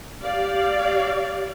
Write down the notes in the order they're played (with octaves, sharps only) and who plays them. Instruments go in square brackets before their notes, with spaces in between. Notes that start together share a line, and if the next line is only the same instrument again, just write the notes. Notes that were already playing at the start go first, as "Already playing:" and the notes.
[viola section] G4 D5 F5